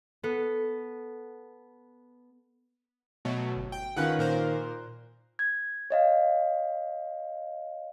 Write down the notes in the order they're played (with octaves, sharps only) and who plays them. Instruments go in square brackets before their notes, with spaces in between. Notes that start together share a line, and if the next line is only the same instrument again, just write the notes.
[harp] B3 A4 F#5
[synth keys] B2 F#3 A3
G1
G5
[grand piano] D#3 F4 F#6 [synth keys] C#4 B4 F#5
[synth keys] A#2 A#4 C5
[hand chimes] G#6
C#5 D#5 F5